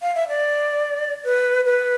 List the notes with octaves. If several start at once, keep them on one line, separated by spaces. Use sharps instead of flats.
F5
E5
D5
B4
B4